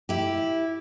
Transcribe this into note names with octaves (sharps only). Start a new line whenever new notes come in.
E4 G4